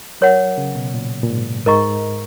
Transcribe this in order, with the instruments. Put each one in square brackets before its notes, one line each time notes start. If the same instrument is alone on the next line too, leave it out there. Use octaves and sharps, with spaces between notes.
[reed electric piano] F#3 [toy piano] A#4 C#5 F#5
[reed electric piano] C#3
B2
A#2
A#2
G#2
[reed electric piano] G#2 [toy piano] A#4 D#5 A#5 C#6